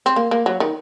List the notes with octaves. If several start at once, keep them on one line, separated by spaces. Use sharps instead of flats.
C4
A#3
A#3
F#3
D#3